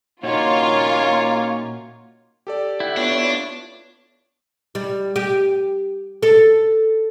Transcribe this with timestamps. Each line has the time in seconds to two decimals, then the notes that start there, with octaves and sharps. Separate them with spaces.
0.23 A#2 A#3 C#4 D#4 F4 F#4 C#5
2.47 G4 A4 D5
2.80 E4 F#5 G5
2.97 B3 D4 F4 C#5
4.75 G3
5.16 G4
6.23 A4